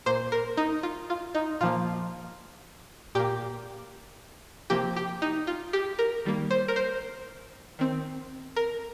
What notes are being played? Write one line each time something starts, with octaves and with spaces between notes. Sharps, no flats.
A#2 A#3 C5
A#4
D#4
F4
F4
D#4
A#2 F3 A#3 F4
A#2 A#3 G4
C3 F3 A#3 G4
G4
D#4
F4
G4
A#4
D#3 G3 A#3
C5
A#4
C5
D#3 C4
A#4